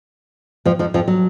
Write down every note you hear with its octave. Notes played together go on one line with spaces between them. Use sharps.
F2 F3
F2 F3
F2 F3
F#3